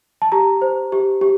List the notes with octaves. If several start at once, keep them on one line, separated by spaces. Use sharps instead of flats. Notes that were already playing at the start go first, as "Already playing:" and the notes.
A5
G4 A#5
C5
G4
G4